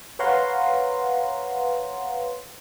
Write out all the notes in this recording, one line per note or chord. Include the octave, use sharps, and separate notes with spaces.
B4 C#5 F5 F#5 A#5 C6